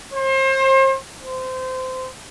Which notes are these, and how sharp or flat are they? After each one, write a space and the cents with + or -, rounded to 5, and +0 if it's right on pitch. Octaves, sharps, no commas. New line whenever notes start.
C5 +35
C5 -20